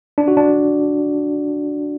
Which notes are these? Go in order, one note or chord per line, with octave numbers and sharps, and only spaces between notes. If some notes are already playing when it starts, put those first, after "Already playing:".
D4
F#4
D4